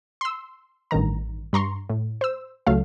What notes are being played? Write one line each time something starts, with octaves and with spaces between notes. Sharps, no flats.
C6 E6
A1 G2 D#3 A#5
G2 A#5 C6 C#6
A2
C5 E6
C#2 F#3 A3 F5